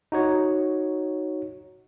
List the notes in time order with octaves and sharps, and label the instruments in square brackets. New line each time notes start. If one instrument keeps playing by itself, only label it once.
[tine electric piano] D#4 F#4 C#5